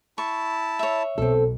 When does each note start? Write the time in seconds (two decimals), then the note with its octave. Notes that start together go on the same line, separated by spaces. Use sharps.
0.18 E4 A5 C#6
0.79 C#5 E5
1.18 B1 C4 A4